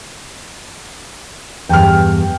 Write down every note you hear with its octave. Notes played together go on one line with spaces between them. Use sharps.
E2 G2 G5 F6